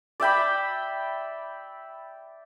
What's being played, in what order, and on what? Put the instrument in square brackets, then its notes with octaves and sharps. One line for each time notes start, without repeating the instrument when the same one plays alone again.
[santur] D5 E5 G5 B5